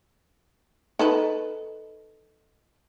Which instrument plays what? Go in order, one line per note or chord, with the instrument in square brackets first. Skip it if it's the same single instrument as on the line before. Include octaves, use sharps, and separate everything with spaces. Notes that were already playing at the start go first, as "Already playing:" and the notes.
[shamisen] D#4 A4 B4